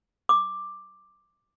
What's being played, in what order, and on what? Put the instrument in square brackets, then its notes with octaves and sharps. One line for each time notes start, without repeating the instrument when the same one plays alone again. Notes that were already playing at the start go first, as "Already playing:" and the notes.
[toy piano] D6